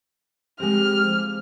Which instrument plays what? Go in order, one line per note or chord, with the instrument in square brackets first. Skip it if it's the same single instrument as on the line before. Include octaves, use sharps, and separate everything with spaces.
[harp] G#3 C4 [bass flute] G4 [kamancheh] F6
[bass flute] F3